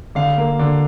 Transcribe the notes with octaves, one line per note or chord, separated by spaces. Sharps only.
D3 F5
A#3
D3